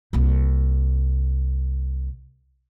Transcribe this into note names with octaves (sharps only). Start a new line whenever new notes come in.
C2 A#3